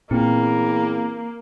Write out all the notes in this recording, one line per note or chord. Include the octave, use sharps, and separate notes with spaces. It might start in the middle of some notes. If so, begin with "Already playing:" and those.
E2 A#2 A#3 C4